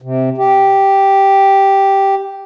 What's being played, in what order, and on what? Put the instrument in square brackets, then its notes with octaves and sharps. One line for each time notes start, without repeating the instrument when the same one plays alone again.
[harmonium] C3
G4